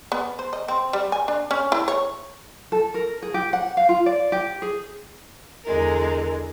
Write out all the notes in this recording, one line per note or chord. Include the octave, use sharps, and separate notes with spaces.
B3
C5
D#5
C4
G3
G#5
D4
C#4
E4
C#5
A4
A#4
G#4
G4
F#5
F5
F4
D5
G4
G#4
E2 D3 G#3 A#4